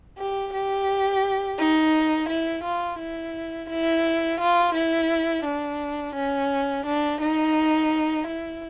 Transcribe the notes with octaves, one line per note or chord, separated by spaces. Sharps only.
G4
G4
D#4
E4
F4
E4
E4
F4
E4
D4
C#4
D4
D#4
E4